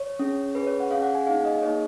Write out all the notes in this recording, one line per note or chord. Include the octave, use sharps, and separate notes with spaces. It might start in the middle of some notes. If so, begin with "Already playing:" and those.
Already playing: C#5
C#4 G#4
C#4 G#4 B4
C#5
F#5
C#4 G#4 F5
F#5
G#5
A#3 D#4 G#4 F5
D#5
D#5
A#3 D#4 G#4 C#5